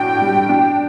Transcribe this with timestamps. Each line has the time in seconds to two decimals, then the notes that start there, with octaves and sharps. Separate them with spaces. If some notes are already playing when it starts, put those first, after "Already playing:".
Already playing: A2 D4 F#4 G5
0.21 G3
0.49 D4